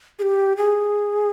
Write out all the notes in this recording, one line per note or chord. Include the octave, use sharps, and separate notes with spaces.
G#4
G4
G#4